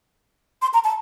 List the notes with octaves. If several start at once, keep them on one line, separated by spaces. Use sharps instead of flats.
C6
A#5
A5